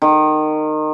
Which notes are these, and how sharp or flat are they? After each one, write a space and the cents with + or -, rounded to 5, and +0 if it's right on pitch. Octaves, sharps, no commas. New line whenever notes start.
D#3 -20